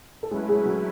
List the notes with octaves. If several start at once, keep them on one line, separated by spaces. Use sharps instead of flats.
A4
F#3 G#3 A3 C#4 E4 G#4 B4
G#3 G#4
F#3 F#4